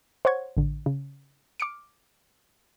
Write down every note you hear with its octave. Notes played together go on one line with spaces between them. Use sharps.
C5 C#5 F#5 C#6 G#6
A1 D3
C#3
D6 F6 C#7 D7